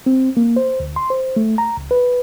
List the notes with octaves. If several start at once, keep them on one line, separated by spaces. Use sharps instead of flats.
C4
A#3
C5
D2
C6
C5
A3
A#5
C#2
B4